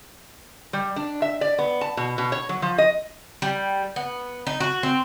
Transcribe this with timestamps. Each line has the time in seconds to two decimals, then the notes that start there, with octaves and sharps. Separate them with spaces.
0.73 G3
0.96 D4
1.22 E5
1.41 D5
1.59 B3
1.81 A5
1.97 B2
2.18 B2
2.32 C#5
2.49 F#3
2.62 F3
2.78 D#5
3.42 G3
3.96 B3
4.47 D#4
4.60 F#4
4.83 C4